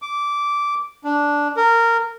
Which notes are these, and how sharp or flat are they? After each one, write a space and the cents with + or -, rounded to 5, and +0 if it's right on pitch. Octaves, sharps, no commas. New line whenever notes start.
D6 -15
D4 -10
A#4 -15